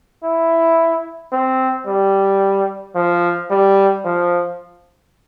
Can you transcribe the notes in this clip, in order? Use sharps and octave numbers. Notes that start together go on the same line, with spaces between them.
E4
C4
G3
F3
G3
F3